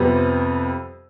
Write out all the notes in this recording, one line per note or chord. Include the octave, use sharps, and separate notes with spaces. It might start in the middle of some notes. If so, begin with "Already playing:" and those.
Already playing: F2 C3 G3 B3